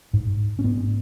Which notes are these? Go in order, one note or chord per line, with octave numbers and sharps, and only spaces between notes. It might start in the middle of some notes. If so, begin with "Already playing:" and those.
G#2
C#4
G#2 B3